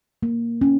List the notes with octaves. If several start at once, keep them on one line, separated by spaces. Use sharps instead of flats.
A#3
C#4